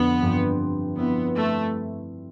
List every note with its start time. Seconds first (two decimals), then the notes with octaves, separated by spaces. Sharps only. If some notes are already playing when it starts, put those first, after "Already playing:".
Already playing: F2 D3 B3
0.22 G2 F3 C4 G4
0.96 G3 B3 C4 E4 B4
1.34 A3